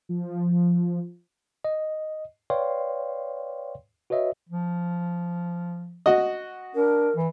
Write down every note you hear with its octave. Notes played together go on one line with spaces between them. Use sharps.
F3
D#5
B4 C#5 D5 F5 G5 C6
F#4 B4 C#5 D#5 E5
F3
F#4 D#5
D4 A#4
E3